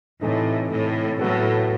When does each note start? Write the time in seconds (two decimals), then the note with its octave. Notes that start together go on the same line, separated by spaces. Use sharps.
0.21 A2 C3 E3 A3 D#4
0.71 A2
1.19 A2 F#3 B3 F#4 A4